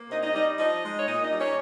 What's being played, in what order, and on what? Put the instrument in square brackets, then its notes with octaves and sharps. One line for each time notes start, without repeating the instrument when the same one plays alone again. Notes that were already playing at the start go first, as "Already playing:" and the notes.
Already playing: [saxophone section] A#3
C3 D#4 D#5
D#4 D#5
G3 D#4 D#5
F3 D#4 D#5
G#3
C#5
A#2 D#4 D#5
D#4 D#5
G3
C#4 C#5